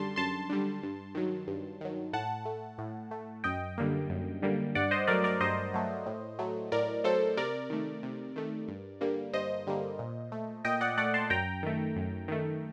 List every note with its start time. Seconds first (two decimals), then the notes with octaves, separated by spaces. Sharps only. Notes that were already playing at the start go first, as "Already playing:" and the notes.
Already playing: F#2 D3 G3 A5 C6
0.16 F#2 A5 C6
0.50 D3 G3
0.83 G2
1.15 D#3 F#3
1.47 G2
1.81 D#3 F#3
2.13 A2 F#5 A5
2.45 A3
2.78 A2
3.11 A3
3.44 F#2 D#5 G5
3.78 D3 G3 A#3
4.09 F#2
4.42 D3 G3 A#3
4.75 G2 D5 F#5
4.91 C5 D#5
5.07 F#3 A3 A#4 D5
5.24 A#4 D5
5.40 G2 C5 D#5
5.74 F#3 A3
6.06 A2
6.39 F#3 A3
6.72 A2 A#4 D5
7.04 F#3 A3 A4 C5
7.37 C3 A#4 D5
7.70 D#3 A3
8.03 C3
8.36 D#3 A3
8.68 G2
9.01 D3 G3 A#3
9.33 G2 C5 D#5
9.67 D3 G3 A#3
9.99 A#2
10.32 A3
10.65 A#2 D#5 G5
10.81 D5 F#5
10.98 A3 D5 F#5
11.14 A5 C6
11.30 F#2 G5 A#5
11.63 D#3 A3
11.96 F#2
12.28 D#3 A3